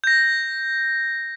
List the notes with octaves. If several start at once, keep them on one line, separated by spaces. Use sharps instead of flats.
G6 A#6